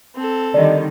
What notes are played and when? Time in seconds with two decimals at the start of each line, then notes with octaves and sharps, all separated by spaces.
0.16 C4 A4
0.54 D3 D#3 G3 D5 D#5